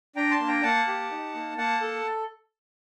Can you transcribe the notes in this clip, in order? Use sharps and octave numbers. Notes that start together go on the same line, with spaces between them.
D4 G5 A#5
A5 C6
A#3
G5 A#5
A#3 F#5 A5
G4
D#4
A#3
A#3 F#5 A5
A4